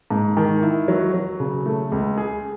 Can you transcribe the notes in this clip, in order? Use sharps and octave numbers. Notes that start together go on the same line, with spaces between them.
G#2
D#3
E4
F#3
F#3
C#3
A3
C#2
G#4